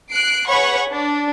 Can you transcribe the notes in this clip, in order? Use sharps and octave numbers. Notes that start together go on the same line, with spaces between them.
F#6 C7 D7
G#4 B4 C#5 F#5 B5 C#6
D4